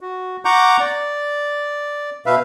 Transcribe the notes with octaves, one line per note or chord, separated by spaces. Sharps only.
F#4
F#5 A#5 C#6 D6 G6
D5
B2 B4 E5 F5